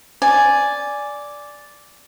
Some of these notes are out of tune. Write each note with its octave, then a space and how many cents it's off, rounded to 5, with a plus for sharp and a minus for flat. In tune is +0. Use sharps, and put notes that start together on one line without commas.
D5 -5 G#5 +0